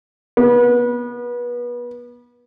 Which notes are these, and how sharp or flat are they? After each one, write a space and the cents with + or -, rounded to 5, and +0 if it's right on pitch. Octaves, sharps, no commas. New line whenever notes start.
B3 -30